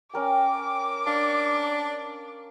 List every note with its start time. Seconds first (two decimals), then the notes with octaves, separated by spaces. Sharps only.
0.13 C#4 A#4 G5 D6
1.06 D4 F5